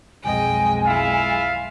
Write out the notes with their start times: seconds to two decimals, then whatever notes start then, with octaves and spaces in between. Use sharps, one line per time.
0.24 B1 F2 G#3 D#5 G5 G#5
0.85 E4 F4 E5 F5